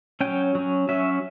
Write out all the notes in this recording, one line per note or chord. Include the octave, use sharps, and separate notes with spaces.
F#3 C#4 G5
F#3 C#4
F#3 C#4 E5